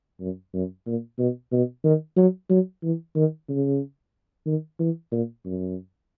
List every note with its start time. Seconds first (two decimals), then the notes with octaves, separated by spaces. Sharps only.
0.20 F#2
0.54 F#2
0.87 A#2
1.19 B2
1.52 B2
1.84 D#3
2.17 F#3
2.50 F#3
2.83 E3
3.16 D#3
3.49 C#3
4.46 D#3
4.79 E3
5.12 A#2
5.46 F#2